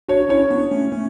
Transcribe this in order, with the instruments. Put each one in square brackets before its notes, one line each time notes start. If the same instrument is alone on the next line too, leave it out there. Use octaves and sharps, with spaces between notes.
[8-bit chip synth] D4 F#4 [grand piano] C#5
[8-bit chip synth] C#4 E4 [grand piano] C#5
[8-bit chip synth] B3 D4
A3 C#4
A3 C#4